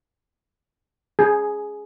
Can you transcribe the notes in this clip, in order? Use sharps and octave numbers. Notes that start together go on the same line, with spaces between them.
G#4